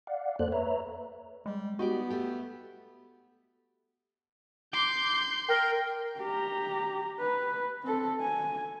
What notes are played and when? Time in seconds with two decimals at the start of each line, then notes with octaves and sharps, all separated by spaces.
0.07 D5 F5 F#5
0.39 F2 A#3 A4 C5 D5 F#6
0.52 B4 C#5 E5 A#5
1.46 G3 G#3
1.79 B3 D#4 F#4 G4 D5
2.10 A3 G4
4.73 C6 D6 G6
5.49 A#4 G5
6.19 G4 A#5
7.20 B4
7.83 C4 A4
8.21 G#5